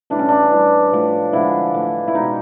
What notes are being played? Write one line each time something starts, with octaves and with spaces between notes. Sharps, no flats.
A2 E3 G3 D4
C#4
D4
A2 E3 G3
A2 F3 A3
D3 F3 G#3 E4
A2 E3 A3
E4
B2 G#3 D#4